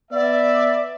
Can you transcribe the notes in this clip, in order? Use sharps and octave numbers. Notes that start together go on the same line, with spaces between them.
B3 D5 E5